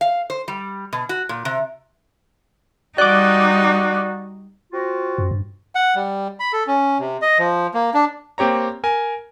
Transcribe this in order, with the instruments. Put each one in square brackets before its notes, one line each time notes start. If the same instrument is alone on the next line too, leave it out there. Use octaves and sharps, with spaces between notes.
[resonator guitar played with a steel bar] F5
C5
G3
B2
F#4
A#2
C3
[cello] G3 D#4 [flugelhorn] F#4 [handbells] D5 [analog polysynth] D6 F#6
[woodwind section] C4 F4 F#4
[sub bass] F#2
G2
[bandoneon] F#5
G3
B5
A4
C#4
C3
D#5
F3
A#3
D4
[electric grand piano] A#3 C4 G4 C#5 A#5
A#4 G#5